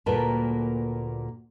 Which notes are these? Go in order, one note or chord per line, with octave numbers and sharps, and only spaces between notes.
D2 A#2 G3 A#3 B4 A5